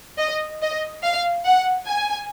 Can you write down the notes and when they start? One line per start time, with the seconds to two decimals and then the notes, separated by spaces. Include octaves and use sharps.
0.19 D#5
0.62 D#5
1.04 F5
1.46 F#5
1.88 G#5